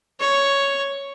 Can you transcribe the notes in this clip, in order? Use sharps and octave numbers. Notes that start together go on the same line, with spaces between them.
C#5